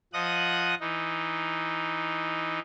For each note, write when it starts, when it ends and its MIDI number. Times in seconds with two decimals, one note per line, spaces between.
0.13 0.75 53
0.13 0.75 75
0.13 0.75 78
0.13 0.75 87
0.13 0.75 90
0.80 2.59 52
0.80 2.59 63